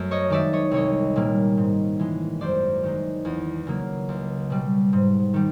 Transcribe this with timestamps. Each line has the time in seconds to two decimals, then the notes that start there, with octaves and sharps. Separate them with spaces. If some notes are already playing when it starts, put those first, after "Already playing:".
Already playing: F#2 A3
0.11 C#5 D#5
0.30 D#3 G#3 D5 E5
0.53 C#5 D#5
0.71 C2 C#5 D#5
1.16 A#2 G3 A#3
1.57 G#2
1.99 E3 G#3
2.41 F#2 C5 D5
2.83 D#3 G#3
3.25 E2
3.67 C#3 F#3 A#3
4.09 C#2
4.50 B2 G3
4.93 G#2
5.34 D#3 G3